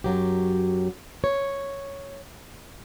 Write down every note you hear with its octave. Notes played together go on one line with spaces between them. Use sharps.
F#2 F#3 G4
C#5